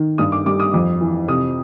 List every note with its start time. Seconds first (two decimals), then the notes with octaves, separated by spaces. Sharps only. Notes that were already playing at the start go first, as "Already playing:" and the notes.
Already playing: D#3
0.18 G2 D#6
0.32 D6
0.46 G3 D6
0.60 D#6
0.74 F2
1.01 E3
1.28 C3 D#6